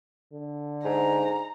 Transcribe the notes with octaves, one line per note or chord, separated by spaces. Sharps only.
D3
G#2 A#5